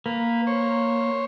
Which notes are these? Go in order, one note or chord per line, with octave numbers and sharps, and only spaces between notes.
A#3 B4
C5 C#5